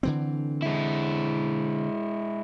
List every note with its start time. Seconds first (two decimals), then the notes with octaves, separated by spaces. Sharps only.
0.03 D3 E3 C4
0.62 G#3 E4